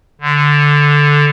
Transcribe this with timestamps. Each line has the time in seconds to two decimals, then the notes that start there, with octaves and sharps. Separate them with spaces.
0.21 D3